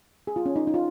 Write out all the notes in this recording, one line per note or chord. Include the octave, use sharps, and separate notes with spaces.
G#4
F4
C#4
D#4
D#4
F4